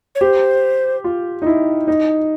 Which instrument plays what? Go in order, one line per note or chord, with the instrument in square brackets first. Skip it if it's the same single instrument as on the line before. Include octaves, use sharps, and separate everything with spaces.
[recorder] C#5
[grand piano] G4 [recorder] C5
[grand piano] F4
D#4
E4
D#4